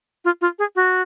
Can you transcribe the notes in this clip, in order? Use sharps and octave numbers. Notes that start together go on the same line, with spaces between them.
F4
F4
G#4
F#4